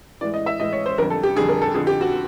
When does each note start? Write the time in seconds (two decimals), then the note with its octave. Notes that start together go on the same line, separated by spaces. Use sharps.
0.21 A2 E3 G#3 D5
0.34 D#5
0.46 E5
0.60 A2 E3 G#3 D#5
0.73 C#5
0.86 C5
0.98 F2 D3 G3 A#4
1.10 A4
1.23 G4
1.36 F2 D3 G3 G#4
1.49 A#4
1.62 A4
1.75 F2 D3 F3 G#4
1.87 G4
2.01 F#4